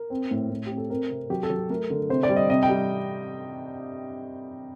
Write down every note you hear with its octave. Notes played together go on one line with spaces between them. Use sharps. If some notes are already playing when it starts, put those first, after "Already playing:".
Already playing: A#4
C4
A2
A2
C4 G4
A4
C4 A#4
C3
F#3 G4
A4
F#3
G4
A3 A#4
D3
C3 C5
D5
G3
D#5
C3 D#5
G5
G3